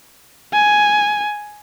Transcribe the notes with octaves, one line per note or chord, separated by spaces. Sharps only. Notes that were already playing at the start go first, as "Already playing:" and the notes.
G#5